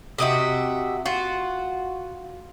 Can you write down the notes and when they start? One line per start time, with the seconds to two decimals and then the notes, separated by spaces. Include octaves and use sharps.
0.18 C3 F#4 G4 D#5 E5
1.06 F4 F#4